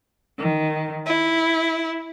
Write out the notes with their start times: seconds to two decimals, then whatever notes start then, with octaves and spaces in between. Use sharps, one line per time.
0.38 D#3
1.06 E4